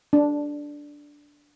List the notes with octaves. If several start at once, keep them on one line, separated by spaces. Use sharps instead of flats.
D4